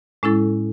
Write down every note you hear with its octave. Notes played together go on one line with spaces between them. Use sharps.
A2 G#3 C#4 E4 A4